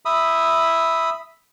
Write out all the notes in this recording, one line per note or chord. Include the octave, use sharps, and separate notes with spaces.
E5 B5 D#6